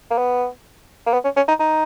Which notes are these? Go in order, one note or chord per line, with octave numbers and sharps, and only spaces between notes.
A#3
B3
A#3
B3
C#4
C#4
D#4
D#4